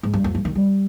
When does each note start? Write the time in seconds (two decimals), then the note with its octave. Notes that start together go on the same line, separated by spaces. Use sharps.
0.03 G#2
0.14 G2
0.24 F2
0.35 G2
0.45 D#3
0.55 G3